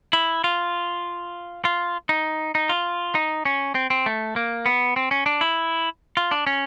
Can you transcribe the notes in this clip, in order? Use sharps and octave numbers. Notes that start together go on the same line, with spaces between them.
E4
F4
F4
D#4
D#4
F4
D#4
C#4
C4
C4
A3
A#3
B3
C4
C#4
D4
E4
F4
D4
C#4